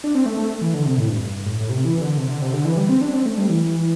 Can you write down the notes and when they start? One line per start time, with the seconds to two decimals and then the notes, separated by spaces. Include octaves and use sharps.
0.04 D4
0.15 C4
0.26 A3
0.37 A3
0.62 E3
0.74 D3
0.86 C3
0.98 A2
1.09 G2
1.21 G2
1.46 A2
1.60 A2
1.70 C3
1.85 E3
2.01 D3
2.17 C3
2.29 D3
2.42 C3
2.53 D3
2.65 E3
2.77 G3
2.89 C4
3.01 D4
3.13 C4
3.26 A3
3.38 G3
3.49 E3